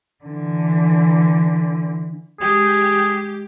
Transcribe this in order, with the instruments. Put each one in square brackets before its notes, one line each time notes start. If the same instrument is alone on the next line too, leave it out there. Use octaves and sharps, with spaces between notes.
[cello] D3 E3
[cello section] G#3 G4 [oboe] G#4